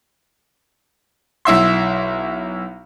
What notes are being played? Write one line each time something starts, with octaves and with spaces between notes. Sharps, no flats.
B1 E4 E5 C6